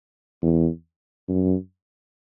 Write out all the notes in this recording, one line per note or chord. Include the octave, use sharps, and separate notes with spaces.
E2
F#2